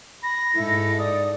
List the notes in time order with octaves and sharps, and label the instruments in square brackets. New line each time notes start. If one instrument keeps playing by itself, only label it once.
[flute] B5 [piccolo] A#6
[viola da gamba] G#2 D#4 A4 [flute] E4
[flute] D5 [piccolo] D#6